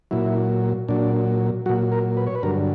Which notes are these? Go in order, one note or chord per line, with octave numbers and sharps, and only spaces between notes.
A#2 F#3 E4
A#2 F#3 D4
A#2 F#3 F#4
A#4
B4
C#5
B4
G2 D3 F#3 A#4